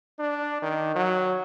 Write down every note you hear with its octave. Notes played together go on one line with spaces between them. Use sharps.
D4
D#3
F#3